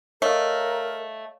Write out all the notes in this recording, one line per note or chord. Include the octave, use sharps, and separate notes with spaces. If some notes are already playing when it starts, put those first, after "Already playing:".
A3 A#4 C#5 D#5 F5